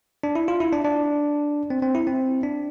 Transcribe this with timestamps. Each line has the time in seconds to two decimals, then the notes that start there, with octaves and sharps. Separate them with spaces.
0.23 D4
0.35 E4
0.48 F4
0.60 E4
0.72 D4
0.85 D4
1.70 C4
1.82 C4
1.95 E4
2.07 C4
2.43 D4